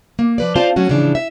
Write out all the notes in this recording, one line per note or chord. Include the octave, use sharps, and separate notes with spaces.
A#3
F3 B4 D5
C4 F4 C5 D5 F5 A5
F#3 A3 C#4 F#4
A2 C#3 E3 F3 D4
E5